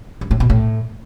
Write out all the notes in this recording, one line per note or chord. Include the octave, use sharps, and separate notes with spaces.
G2
A2
B2
A2